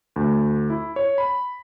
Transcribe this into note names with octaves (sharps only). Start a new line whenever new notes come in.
D2
E4
C#5
B5